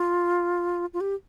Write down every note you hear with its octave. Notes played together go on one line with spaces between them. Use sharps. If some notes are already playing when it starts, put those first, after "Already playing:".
Already playing: F4
F4
G4